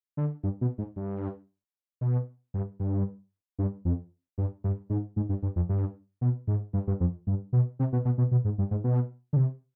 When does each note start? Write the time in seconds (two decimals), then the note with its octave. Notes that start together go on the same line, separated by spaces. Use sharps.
0.17 D3
0.43 G2
0.61 B2
0.78 G#2
0.96 G2
2.01 B2
2.54 G2
2.80 G2
3.59 G2
3.85 F2
4.38 G2
4.64 G2
4.90 G#2
5.16 G#2
5.29 G2
5.42 G2
5.56 F2
5.69 G2
6.21 B2
6.47 G#2
6.73 G2
6.87 G2
7.00 F2
7.27 G2
7.53 B2
7.79 C3
7.93 B2
8.05 B2
8.18 B2
8.31 B2
8.45 G#2
8.58 G2
8.71 G#2
8.84 B2
9.33 D3
9.36 C3